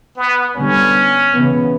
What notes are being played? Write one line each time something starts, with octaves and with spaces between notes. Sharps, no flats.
B3
D3 G3 B3 C#4
C#3 E3 B3